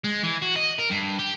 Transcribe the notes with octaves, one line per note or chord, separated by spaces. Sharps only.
G#3
E3
F#4
D#5
A#4
G2
G4